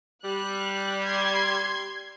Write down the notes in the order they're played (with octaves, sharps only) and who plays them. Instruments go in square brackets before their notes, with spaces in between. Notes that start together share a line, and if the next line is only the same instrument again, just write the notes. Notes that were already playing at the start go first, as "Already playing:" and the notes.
[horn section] G3 [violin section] F#6
[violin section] C6 G#6